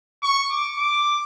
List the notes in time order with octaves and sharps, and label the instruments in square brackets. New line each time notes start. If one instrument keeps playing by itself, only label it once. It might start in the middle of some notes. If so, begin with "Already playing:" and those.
[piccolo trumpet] C#6
D6
D6